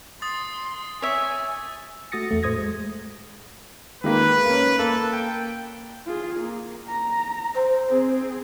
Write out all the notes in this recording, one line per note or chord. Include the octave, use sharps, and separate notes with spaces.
C6 D#6 A6
C#5 E5 G#5
A3 F#4 D#6 A6 A#6 C#7
E2 A3
A2 A3 C5 D#6 G#6 A#6
G#3
D#3 G#3 A#3 B4
A#3 C#4
A#3 A4
G5
F4 G#4
A#3
A#5
C5
C4 G#4